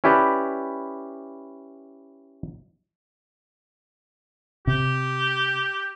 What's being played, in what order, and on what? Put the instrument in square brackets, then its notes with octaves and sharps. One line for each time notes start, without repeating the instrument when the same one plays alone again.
[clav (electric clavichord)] C#4 E4 G4 B4 D5
[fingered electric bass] C3 [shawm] G4